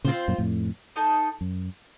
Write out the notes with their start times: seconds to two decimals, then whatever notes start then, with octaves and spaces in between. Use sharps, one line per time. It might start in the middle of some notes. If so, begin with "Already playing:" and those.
0.04 A#2 C#3 C4 F4 C5
0.28 F#2 A#2
0.38 F2 A2
0.96 D#4 A4 D#5
1.41 F#2